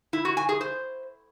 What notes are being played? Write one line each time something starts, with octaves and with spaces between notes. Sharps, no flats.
E4
F#4
G#5
G#4
C5